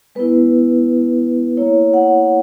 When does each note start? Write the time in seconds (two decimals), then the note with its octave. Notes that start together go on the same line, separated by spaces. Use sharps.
0.15 G#3 B3 E4 B4
1.57 A#3 E4 C#5
1.94 F#5